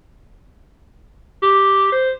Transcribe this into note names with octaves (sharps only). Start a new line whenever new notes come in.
G4
C5